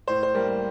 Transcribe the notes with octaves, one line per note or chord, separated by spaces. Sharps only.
A2 C5
C5
G3 A#3 A#4